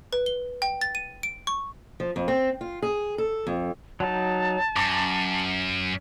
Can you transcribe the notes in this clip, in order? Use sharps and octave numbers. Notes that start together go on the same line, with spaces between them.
B4
G7
G5
A6
D#7
D7
C#6
F3
F2
C4
F4
G#4
A4
F2
F#3 D#4 A5
F#2 A#5 D6